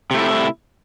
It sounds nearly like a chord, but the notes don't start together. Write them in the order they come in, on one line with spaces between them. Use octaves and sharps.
C3 A3 E4